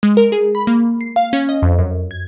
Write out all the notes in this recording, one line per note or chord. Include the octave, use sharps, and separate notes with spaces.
G#3
A#4
G#4
B5
A#3
C7
F5
C#4
D#5
F2
F#2
G#6